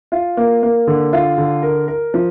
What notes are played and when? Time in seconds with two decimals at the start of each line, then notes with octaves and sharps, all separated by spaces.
0.12 F4
0.37 A#3
0.63 A#3
0.87 D3
1.13 F4
1.38 D3
1.63 A#4
1.88 A#4
2.14 F3